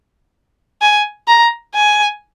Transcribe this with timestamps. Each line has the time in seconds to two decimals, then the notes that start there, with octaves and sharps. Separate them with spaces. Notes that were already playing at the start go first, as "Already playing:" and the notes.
0.81 G#5
1.28 A#5
1.75 G#5